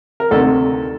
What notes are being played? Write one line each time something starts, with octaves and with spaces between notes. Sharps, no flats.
A#4
D2 C3 D#3 A4